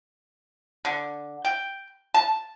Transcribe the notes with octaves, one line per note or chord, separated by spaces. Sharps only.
D3
G5
A5